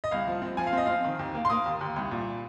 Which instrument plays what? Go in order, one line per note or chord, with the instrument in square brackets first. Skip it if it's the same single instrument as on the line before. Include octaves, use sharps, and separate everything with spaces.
[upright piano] D#5
C2 F5
F3
C4
F3 G#5
F5
C4 D#5
C4 F5
D#3
D#2
A#3
C6
A#3 D#6
D#2
D#2
C2
A#2